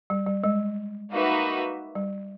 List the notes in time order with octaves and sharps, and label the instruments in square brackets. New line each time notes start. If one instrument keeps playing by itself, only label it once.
[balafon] G3
G3
G#3
[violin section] A#3 D#4 F#4 B4 E5
[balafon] G3